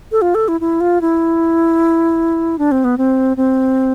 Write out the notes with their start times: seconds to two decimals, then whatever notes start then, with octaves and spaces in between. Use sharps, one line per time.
0.12 A4
0.22 F4
0.35 A4
0.48 E4
0.61 E4
0.80 F4
1.01 E4
2.59 D4
2.72 C4
2.84 B3
2.98 C4
3.37 C4